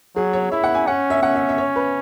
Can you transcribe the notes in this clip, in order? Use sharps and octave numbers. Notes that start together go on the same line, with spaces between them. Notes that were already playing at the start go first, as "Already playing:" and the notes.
F#3 G#4
C#5
E4 E5
F#5
G#5
C#4 F#5
E5
C#4 F#5
E5
E5
C#5
B4